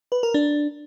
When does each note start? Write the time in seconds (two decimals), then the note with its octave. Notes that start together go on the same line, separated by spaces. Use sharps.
0.12 B4
0.23 A#4
0.34 D4